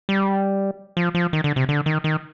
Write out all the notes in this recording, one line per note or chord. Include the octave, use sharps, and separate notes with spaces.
G3
F3
F3
D#3
D3
C3
D3
D#3
D#3